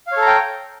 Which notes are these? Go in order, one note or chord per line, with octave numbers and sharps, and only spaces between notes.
A4 C#5 F5 G5 A#5